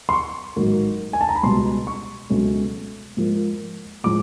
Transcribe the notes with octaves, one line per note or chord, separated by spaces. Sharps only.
C6
C#6
A1 G#2 D#3 F#3 A#3
G#5
A5
A#5
B5
C#2 B2 G3 C6
C#6
C#2 B2 F#3 A3 C#4
G#2 F3 A#3
A2 F3 G#3 D6